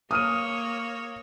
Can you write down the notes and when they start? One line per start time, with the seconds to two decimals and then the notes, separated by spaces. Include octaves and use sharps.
0.11 A#3 C#5 D#6 F6 D#7